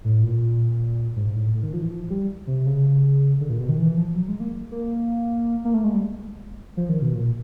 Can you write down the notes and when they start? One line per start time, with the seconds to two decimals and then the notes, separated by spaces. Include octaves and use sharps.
0.05 A2
0.23 A#2
1.16 G#2
1.36 A2
1.54 A2
1.63 D#3
1.73 F3
1.82 E3
1.91 F3
2.10 G3
2.47 C3
2.66 C#3
3.41 D3
3.50 A#2
3.60 B2
3.69 D#3
3.78 E3
3.97 F3
4.15 F#3
4.28 G#3
4.40 A#3
4.72 A#3
5.65 A#3
5.74 A3
5.84 G#3
5.94 G3
6.77 F3
6.89 D#3
7.02 B2
7.14 A#2